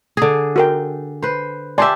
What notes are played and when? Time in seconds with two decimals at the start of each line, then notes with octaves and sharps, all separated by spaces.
0.17 D3 G#4
0.56 F#4 A#4 G5
1.22 B4 C5
1.78 D4 G4 D5 E5 G#5 C6